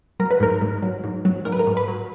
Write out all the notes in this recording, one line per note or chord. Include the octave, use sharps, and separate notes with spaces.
F#3 A#4
B4
G#2 A#4
G#2
F#3
G#2
F#3
G#2 A#4
B4
A#4
G#2
B4
F#3